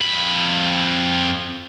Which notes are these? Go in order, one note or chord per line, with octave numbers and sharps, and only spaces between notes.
F2 B5